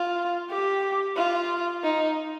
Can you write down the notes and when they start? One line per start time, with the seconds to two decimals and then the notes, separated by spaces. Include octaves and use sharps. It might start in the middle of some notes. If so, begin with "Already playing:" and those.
Already playing: F4
0.50 G4
1.16 F4
1.84 D#4